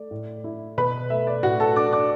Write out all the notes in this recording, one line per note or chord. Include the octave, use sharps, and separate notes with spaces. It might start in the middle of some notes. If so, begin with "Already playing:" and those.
Already playing: A3 D5
A2
E4
B2 B4 B5
A3 E5
D5
A2 F#4 F#5
A4 A5
D4 D5 D6
D5 D6